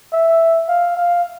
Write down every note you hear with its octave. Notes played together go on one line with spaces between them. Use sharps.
E5
F5
F5